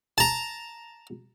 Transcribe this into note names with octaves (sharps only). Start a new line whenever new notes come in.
A5 A#5